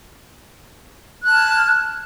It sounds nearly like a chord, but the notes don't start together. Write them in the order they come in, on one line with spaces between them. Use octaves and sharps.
F#6 A5 F6 G#6